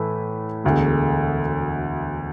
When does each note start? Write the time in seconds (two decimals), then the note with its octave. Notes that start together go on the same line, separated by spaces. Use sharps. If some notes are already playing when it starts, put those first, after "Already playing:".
Already playing: A2 E3 A3 E4 B4
0.64 E1 D2 D3 G#3